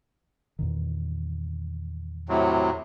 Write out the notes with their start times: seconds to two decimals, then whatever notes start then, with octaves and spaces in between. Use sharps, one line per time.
0.59 E2 A#2 D#3
2.29 A2 C3 F#3